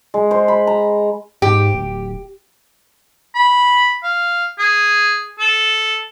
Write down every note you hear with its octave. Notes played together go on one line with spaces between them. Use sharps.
G#3
C5
B5
A#5
G#2 G4
D1
B5
F5
G#4
A4